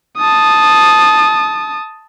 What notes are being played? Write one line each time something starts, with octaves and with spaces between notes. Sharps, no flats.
A5 D#6